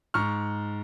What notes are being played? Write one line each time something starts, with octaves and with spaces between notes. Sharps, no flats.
G#2 C#6 F6